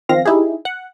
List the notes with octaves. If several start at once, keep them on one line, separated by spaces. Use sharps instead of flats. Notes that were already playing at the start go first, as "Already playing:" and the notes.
D#3 F3 C4 F5 A#6
D#4 E4 G4 G#4
F#5